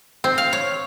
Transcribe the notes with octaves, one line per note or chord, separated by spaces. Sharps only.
C4
F5
C#5